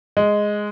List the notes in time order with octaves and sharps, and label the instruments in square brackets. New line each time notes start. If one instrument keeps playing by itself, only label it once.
[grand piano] G#3